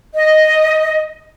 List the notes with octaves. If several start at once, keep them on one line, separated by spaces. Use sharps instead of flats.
D#5